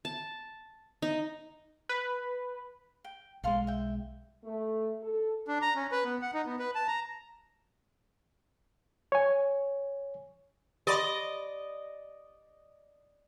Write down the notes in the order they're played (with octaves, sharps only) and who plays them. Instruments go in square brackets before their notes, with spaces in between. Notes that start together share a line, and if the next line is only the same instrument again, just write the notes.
[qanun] A5
D#4
[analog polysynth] B4
[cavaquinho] G5
[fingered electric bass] B1 G#3 [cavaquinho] A4 F5 C6
[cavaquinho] E5 G5
[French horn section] A3
A4
[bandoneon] D4
A#5
C#4
B4
B3
F#5
D#4
B3
B4
A5
A#5
[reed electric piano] C#5 G#5
[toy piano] G4 B5 C6 [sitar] D5 D#5